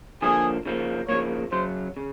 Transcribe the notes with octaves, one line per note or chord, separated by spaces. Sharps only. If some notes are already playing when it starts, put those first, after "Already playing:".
D3 F3 A#3 G#4
C#3 F3 A#3
C#3 F3 A#3 C#5
F#2 C#3 F#3 C5
C#3